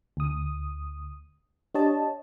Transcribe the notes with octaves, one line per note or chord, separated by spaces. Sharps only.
D2 D#6
D4 G4 C#5 D#5 A5